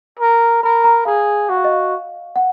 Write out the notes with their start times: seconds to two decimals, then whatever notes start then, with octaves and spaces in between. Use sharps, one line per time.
0.19 A#4
0.63 A#4 B5
0.84 A#5
1.05 G#4 F5
1.49 F#4 F#5
1.57 F5
1.64 D#5
1.72 F5
2.36 F#5